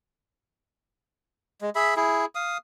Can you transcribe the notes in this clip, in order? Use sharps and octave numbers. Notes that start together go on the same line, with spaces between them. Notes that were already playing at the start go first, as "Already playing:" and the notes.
G#3
G#4 E5 B5
E4 G#4
F5 D#6